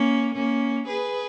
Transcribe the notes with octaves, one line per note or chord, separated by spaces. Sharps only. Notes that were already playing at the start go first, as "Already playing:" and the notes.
Already playing: A#3 C#4
A#3 C#4
G#4 B4